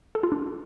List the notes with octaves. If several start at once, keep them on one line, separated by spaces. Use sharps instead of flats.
A4
F4
D4